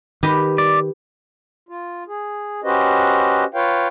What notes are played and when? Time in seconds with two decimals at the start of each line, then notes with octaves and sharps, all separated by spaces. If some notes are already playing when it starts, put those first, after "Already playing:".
0.23 D#3 G4 B4 D#5
0.58 D5
1.69 F4
2.08 G#4
2.64 C#4 F#4 G4 B4 C5 D#5
3.54 F4 B4 C#5 F5 G5